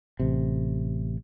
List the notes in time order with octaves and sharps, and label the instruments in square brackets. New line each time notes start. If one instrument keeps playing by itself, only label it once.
[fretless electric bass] A1 C3